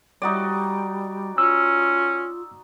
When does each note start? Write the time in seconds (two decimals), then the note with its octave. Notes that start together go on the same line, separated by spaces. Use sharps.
0.22 G3 D#4 F#4 D5
1.38 C#4 F4 E6